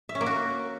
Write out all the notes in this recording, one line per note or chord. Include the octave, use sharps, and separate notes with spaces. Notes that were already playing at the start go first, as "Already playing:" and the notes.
E5
C#4
A#3
F#4